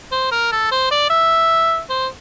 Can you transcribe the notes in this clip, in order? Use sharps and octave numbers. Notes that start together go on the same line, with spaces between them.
C5
A#4
A4
C5
D5
E5
C5